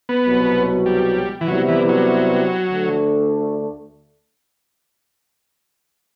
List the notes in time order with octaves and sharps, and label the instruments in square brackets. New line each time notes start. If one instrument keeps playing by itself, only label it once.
[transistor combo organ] B3
[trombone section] C2 B2 F#3
[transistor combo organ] G3
E3
[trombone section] C3 G3 B3 E4 [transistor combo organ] F#3
[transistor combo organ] E3
F#3
[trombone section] D2 D3 A3 D4